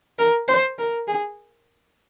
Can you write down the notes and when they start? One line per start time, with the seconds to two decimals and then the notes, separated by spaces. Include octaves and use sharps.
0.19 A#4
0.48 C5
0.78 A#4
1.08 G#4